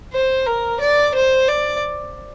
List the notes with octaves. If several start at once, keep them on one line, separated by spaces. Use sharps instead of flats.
C5
A#4
D5
C5
D5